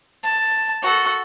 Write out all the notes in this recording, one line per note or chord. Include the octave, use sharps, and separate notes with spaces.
A5
F#4 A4